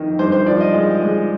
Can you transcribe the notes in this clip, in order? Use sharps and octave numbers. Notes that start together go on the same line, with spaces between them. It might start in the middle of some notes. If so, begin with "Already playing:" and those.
Already playing: F2 D#3
G2 C5
C5
F3 D5
D#5
G#3
G#3